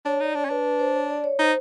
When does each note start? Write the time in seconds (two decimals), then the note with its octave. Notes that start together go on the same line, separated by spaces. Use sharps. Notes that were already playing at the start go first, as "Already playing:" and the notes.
0.05 D4 C#5
0.20 D#4 D5
0.35 D4 C#5
0.45 C#4
0.50 D4 B4
0.65 B4
0.79 C5
0.94 C#5
1.10 D5
1.24 C#5
1.39 D#4 C5